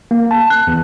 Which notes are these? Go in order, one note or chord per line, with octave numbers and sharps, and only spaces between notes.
A#3
A5
F#6
E2